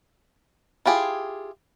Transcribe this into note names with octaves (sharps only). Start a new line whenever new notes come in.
E4 F4 G4 G#4